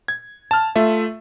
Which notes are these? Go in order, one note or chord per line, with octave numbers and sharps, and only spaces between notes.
G#6
A5 F6
A3 F4 E5